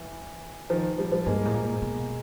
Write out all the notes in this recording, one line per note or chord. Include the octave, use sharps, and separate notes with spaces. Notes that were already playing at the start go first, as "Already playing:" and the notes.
Already playing: E3
D#3 F3
F3 G3
F3 G3
G2 G#3 A#3
A2
A#2
B2